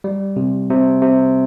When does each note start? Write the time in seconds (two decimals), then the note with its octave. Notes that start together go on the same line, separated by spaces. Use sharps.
0.04 G3
0.36 C3
0.70 C3
1.02 C3